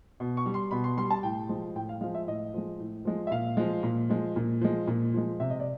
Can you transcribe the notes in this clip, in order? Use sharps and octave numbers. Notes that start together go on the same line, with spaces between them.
B2
C#6
G3
C6
B2 B5
C6
G3 C6
A5
A2 G5
F3 G#3
A2 G5
F5
F3 G#3 F5
E5
A2 D#5
F3 G#3
A2
F3 G#3
E5
A#2 F5
F3 G#3
A#2
F3 G#3
A#2
F3 G#3
A#2
F3 G#3
C3 E5
D#5
D5